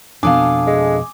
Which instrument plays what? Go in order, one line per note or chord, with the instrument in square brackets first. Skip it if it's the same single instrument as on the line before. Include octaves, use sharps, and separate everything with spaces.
[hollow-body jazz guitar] F2 B2 [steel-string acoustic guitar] D4 A4 F5 [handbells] G#5 D6 D#6
[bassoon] G#3